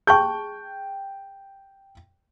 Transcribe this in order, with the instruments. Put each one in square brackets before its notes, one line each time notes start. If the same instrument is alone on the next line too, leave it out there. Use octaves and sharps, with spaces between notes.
[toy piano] G#4 A5 C#6 [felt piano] G5 G6